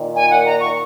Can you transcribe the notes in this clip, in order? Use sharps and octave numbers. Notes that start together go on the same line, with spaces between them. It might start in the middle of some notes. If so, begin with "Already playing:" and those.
Already playing: A#2 D#3
G#5
F#5
A#5
C#6